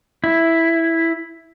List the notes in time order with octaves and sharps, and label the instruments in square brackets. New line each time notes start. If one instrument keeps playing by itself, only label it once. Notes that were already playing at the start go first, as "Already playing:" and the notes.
[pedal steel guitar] E4